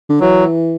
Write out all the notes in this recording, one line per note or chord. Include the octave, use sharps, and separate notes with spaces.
D3
E3 F#3